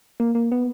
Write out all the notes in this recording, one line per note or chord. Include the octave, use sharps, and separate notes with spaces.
A#3
A#3
B3